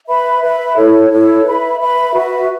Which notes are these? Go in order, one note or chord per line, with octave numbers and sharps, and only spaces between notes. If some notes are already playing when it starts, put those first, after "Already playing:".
B4 E5 B5
B4 E5 B5
E4 A4 C#5
E4 A4 C#5
B4 E5 B5
B4 E5 B5
F#4 B4 E5